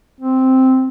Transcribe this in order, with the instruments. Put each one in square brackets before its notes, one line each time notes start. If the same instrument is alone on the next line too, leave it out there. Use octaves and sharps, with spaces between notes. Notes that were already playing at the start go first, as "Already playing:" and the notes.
[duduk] C4